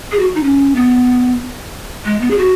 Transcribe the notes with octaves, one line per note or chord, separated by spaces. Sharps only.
G#4
F#4
D#4
C#4
B3
G#3
B3
G#4
F#4